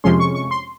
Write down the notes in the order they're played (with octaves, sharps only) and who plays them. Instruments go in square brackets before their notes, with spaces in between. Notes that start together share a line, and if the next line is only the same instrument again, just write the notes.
[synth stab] F2 C3 F3 G#3 C#4 C6
C#6
C#6
C6